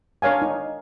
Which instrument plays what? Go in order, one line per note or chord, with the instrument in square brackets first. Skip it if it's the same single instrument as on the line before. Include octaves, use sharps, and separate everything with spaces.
[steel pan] D4 A#4 C#5 F5 G#5
D#4